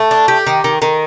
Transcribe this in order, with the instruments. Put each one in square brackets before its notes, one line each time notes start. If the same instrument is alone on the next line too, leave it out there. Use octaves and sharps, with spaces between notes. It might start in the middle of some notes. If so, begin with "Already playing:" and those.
Already playing: [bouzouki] A3
D4
G4
D#3
D#3
D#3